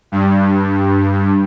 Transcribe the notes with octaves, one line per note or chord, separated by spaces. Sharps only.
G2